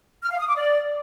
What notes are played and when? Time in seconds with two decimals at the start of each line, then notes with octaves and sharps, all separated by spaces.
0.22 F6
0.31 F5
0.39 D#6
0.48 D6
0.56 D5